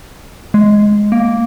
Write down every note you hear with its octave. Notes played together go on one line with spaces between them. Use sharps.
G#3
A#3